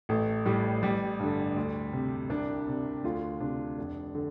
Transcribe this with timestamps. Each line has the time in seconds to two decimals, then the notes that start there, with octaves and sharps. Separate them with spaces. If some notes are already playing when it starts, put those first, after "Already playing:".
0.09 A1 A3
0.46 A2 G3
0.83 A1 G3
1.19 G2 D3
1.56 D2
1.93 C3
2.30 C2 D4
2.67 C3
3.04 D2 F4
3.40 C3 D4
3.78 F1
4.15 D3